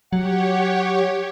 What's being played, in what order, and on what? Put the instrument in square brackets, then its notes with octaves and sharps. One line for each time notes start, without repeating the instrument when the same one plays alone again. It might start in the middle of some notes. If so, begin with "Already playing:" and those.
[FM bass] F#3 [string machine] G4 C#5 [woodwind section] F#5